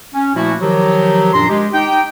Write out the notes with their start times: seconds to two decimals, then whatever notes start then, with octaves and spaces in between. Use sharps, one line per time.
0.13 C#4
0.35 A#2 F3 A3 A#3 E4 F#4
0.61 D#3 F3 F#3 G4
1.34 F#2 A#2 D4 A#5 C6
1.49 G#3 G4
1.74 D#4 G4 G5